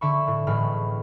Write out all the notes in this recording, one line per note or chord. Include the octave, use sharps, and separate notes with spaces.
D3 E5 B5 C#6
A2
A1 A2 G#3 B5 F6